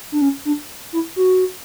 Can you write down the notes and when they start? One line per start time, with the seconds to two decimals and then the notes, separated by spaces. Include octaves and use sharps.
0.12 D4
0.22 C#4
0.45 D4
0.93 E4
1.16 F#4